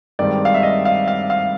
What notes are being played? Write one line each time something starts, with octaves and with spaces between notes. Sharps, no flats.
G2 D#3 G#3 C4 D5
F5
E5
D#5
F5
F5
F5